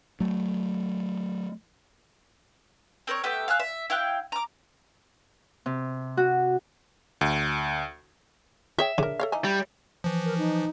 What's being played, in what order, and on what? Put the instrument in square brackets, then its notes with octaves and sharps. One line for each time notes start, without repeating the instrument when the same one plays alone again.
[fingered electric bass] F#3 A3
[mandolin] C4 A#4 C5 C#5
A3 B3 G4 E5
F5 G#5 E6 F#6
E5
E4 F5 G5 F#6
A#5 D6
[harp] C3
F#4
[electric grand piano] D2
[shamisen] G#4 C#5 G5 [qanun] E5
[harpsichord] C#3 [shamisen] D4 A#4
[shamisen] A4 C#5 F5
E3 D#4 G#5
[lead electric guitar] G3
[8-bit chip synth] E3 F3
[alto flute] A#4
D#4